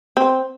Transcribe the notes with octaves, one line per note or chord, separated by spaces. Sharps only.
C4